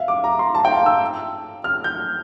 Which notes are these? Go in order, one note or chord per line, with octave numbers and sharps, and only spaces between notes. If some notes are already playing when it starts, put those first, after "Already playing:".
Already playing: E5 F5
D6
A#5
C6
A5
G5
F5
E6
F6
G6